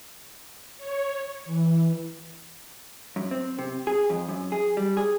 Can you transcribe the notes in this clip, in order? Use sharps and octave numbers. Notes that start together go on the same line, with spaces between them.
C#5
E3
F#2
C4
C3
G#4
F2
F#2
G#4
G3
G#4